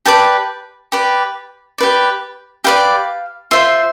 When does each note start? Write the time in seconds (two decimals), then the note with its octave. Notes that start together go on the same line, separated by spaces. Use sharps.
0.05 G4 B4 D5 A5
0.92 G4 B4 D5
1.78 G4 B4 D5
2.64 G4 B4 D5 F5
3.51 F4 C5 E5